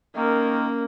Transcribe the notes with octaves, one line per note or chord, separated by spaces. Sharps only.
D#3 A#3 C#4 A#4